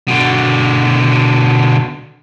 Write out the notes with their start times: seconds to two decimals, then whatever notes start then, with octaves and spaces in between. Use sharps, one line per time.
0.08 B2 D3